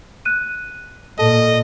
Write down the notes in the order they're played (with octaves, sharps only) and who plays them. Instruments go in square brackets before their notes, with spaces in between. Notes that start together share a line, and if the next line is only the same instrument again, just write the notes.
[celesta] F#6 D#7
[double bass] A#2 [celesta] A4 A5 [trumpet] D#5